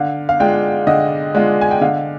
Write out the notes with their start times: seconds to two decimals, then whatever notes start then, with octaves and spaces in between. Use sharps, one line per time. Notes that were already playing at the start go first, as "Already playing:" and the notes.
Already playing: D3 F5
0.29 F5
0.40 G#3 D4 F4 G5
0.87 D3 D#5
1.35 G#3 D4 F4
1.61 G#5
1.71 G5
1.81 D3 F5